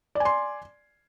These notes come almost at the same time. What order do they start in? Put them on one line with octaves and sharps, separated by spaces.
D5 G#5 C6